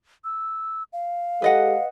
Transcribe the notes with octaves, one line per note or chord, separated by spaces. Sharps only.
E6
F5
G#3 G4 A4 B4 D#5 F#5